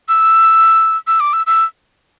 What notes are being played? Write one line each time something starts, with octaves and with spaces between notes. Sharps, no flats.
E6
E6
D6
E6
E6